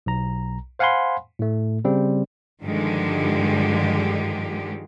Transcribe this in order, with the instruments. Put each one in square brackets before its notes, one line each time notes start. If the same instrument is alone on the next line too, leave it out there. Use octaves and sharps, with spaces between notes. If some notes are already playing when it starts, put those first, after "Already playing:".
[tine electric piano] B1 A#5
C5 F5 F#5 G#5 B5 C6
A2 A3
C#3 G3 C4
[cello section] G2 D3 D#3 F3 G#3 G4